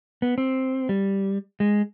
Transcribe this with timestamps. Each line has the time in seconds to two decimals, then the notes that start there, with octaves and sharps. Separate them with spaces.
0.22 B3
0.38 C4
0.89 G3
1.60 G#3